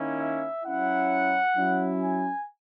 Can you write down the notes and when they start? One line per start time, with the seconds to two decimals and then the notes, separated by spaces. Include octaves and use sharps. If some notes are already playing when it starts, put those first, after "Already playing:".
Already playing: D#3 A#3 C#4 E4
0.19 E5
0.65 F#3 C#4 E4 F#5
1.57 F#3 C#4 E4
2.03 G#5